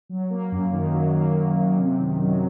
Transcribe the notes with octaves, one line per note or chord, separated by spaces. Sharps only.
F#3
A#3
F#2
D#3
F#3
A#3
F#2
F#2
C3
D#3
F#3